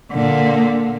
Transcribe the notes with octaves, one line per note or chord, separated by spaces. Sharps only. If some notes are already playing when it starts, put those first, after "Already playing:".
A#2 D3